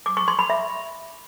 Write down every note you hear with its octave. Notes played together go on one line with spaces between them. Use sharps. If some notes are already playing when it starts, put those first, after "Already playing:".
D6
C#6
C6
B5
E5